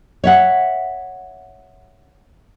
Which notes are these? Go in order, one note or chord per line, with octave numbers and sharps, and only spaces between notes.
C#5 E5 F#5